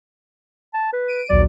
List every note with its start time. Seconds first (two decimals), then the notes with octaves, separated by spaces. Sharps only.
0.74 A5
0.93 B4
1.08 D7 D#7
1.29 A#1 D#2 F#3 D5